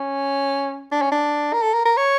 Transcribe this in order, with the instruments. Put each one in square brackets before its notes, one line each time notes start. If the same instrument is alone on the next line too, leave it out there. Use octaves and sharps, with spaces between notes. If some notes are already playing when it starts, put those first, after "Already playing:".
Already playing: [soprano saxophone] C#4
D4
C#4
D4
A#4
A4
A#4
A#4
C#5